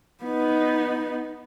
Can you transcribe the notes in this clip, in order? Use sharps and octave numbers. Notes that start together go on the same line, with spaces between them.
B3 D#4